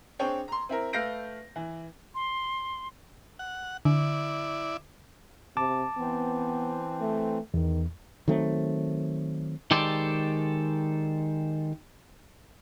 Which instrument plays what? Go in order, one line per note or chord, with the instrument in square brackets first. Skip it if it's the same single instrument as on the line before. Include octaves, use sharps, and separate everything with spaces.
[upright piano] C4 D4 G#4 C#5 G5
A#5 C6
C4 E4 A#4
A3 B4 F5 G6 A#6 D7
E3
[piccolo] C6
[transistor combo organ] F#5
[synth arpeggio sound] D3 [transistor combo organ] E4 D5
[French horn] C3 [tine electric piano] A5 D6
[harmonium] E3 C4 [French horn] B3
[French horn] A3
[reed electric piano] E2 [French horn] D#3
[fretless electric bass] D#3 F#3 A3 C4
[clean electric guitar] D#3 G#3 G4 A4 C5 D5